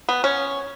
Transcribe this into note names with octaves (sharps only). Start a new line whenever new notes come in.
B3
C#4